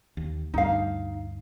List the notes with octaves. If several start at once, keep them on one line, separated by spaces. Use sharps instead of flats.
D#2
D2 G2 D#4 F5